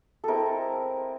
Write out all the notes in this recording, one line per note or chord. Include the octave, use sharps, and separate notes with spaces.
G#3 C4 E4 A4 A#4